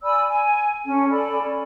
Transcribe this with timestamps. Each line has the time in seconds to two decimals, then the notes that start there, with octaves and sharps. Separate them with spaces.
0.03 D5 G#5 B5 E6
0.28 G#5
0.85 C#4 A4
1.10 A4 D5 G#5 B5
1.40 C#4